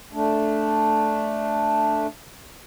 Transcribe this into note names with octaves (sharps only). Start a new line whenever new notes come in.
A3 D4